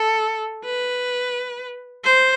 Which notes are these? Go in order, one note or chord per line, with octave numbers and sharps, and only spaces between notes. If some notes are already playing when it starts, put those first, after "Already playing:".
Already playing: A4
B4
C5